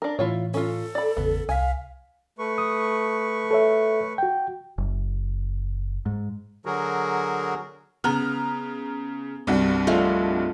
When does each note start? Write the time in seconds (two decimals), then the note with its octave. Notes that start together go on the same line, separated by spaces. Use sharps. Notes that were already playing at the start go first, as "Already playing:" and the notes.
0.02 D4 A#4
0.19 A2 E3 E4 F4 C#5
0.54 C#4 F4 A4
0.95 D5 B5
1.17 G#1 E2 C#3 B3
1.49 C2 F5 G#5 B6
2.39 A3 B4 C#6
2.58 D#6
3.51 A4 C#5 E5
4.18 F#4 G5
4.78 F#1
6.06 G#2
6.66 D3 F#3 F#4 G#4 A#4
8.04 C#3 B3 A#5 F6
9.47 C2 G2 F#4
9.87 F3 G#3 A3